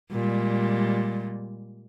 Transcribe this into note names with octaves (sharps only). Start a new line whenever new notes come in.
A#2 G3 G#3